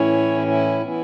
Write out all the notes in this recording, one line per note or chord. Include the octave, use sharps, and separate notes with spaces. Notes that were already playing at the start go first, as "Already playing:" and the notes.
Already playing: A2 E3 C#4 E4 C#5
E4
E3 B3 E4